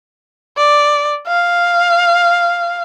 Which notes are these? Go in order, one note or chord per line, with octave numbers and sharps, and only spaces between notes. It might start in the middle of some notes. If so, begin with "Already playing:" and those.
D5
F5